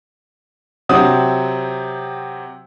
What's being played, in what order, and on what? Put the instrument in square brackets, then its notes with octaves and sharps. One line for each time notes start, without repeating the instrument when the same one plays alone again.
[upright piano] C3 F#3 C4 F#5 D#6